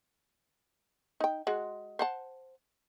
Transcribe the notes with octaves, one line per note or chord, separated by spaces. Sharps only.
D#4 G5
G#3 F#4
C5 F#5 A5